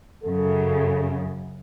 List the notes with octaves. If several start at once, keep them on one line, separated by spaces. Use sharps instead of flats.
F#2 C#3 A4